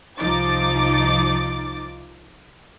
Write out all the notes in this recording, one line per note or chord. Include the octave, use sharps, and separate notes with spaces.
C2 F3 D#4 D6 A6